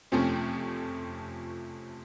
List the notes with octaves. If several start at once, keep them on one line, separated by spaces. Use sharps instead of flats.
F2 C3 F3 A3 C#4